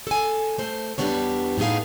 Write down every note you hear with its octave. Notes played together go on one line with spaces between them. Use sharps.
A4 G#5
A3 C5
E2 C3 G3 B3 D4 C#5
A2 B3 D#4 G#4 F5